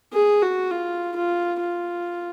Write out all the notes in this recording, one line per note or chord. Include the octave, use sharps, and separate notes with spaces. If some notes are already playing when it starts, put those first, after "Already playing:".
G#4
F#4
F4
F4
F4